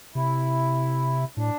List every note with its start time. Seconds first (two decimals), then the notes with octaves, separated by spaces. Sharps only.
0.15 C3 E4
1.37 A2 D4